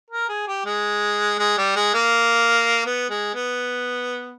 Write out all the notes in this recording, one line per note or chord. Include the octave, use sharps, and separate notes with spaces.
A#4
G#4
G4
G#3
G#3
G3
G#3
A#3
B3
G#3
B3